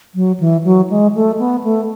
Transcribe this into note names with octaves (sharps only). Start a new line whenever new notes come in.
F#3
E3
F#3
G#3
A3
B3
A3